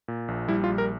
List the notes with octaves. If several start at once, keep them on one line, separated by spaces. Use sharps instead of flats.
A#2
A#1
G3 E4
F4
A#1
A#4